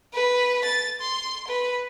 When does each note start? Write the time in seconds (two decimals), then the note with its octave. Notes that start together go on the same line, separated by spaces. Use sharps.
0.13 B4
0.64 A6
1.00 C6
1.47 B4